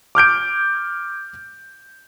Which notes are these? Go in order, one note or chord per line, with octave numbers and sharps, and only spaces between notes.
D6 F6 G6 D7